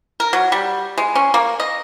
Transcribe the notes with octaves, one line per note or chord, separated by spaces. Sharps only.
A#4
F#3
G3
G#3
C#4
A#3
D#5